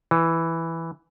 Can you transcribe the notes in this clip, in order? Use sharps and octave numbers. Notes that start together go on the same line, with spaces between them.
E3